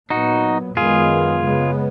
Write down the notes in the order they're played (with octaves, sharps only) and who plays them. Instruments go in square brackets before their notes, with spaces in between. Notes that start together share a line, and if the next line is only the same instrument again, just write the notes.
[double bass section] A#2 F#3 B3 [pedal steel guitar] D#4 F#4
[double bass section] F#2 D#3 G#3 B3 [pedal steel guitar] F4 G#4
[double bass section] C#3 G#3 B3